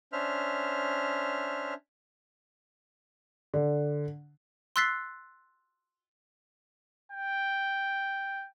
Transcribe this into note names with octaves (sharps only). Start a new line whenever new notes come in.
C#4 D4 C5 E5 F6
D3
C6 E6 F#6 A6 B6 C7
G5